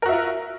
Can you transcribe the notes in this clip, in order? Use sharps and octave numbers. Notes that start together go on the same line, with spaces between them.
F4 F#4 A#4 E5